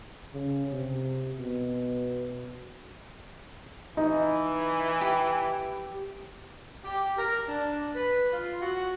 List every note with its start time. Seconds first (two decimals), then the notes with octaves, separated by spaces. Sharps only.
0.34 C#3
0.72 C3
1.36 B2
3.97 E3 D#4
5.01 G4
6.84 G4
7.18 A#4
7.48 D4
7.94 B4
8.33 F4
8.62 F#4